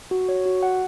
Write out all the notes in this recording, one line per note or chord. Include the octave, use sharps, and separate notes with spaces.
F#4
C#5
F#4
F#5